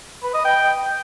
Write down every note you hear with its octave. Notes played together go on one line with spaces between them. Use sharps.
B4
D#5
G5